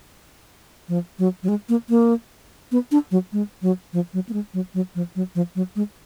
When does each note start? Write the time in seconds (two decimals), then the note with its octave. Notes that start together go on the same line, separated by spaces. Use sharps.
0.88 F3
1.19 F#3
1.43 F#3
1.48 G#3
1.69 A#3
1.89 A#3
2.72 B3
2.91 D4
3.11 F#3
3.33 G#3
3.62 F#3
3.93 F3
4.13 F#3
4.29 A#3
4.33 G#3
4.54 F#3
4.74 F#3
4.95 F3
5.15 F#3
5.35 F3
5.55 F#3
5.76 G#3